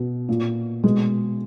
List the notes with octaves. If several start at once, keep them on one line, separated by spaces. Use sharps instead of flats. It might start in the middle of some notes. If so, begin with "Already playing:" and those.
Already playing: B2
A#2
B2 G#3